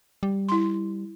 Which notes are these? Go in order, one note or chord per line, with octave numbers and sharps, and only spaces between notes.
G3
E4 C6